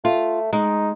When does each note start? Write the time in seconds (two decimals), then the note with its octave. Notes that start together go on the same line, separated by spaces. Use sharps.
0.05 A3 F4
0.53 G#3 D#4